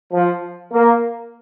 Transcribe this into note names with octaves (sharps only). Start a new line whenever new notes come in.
F3
A#3